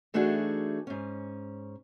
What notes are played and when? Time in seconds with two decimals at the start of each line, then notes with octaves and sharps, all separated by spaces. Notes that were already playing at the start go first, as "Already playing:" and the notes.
0.14 E3 A3 D4 D#4 F#4 G#4
0.87 G#2 C#4